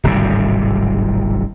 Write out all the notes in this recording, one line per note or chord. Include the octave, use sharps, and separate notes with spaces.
D1 G#1 C3 G3